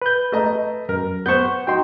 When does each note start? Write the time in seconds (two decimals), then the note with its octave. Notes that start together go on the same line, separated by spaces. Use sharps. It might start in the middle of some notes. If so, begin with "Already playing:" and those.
0.02 B4 G6
0.32 A3 D#5 A#5
0.89 F#2 A#4
1.26 B3 C5 C#6 G6
1.67 F#3 D#4 G5 C6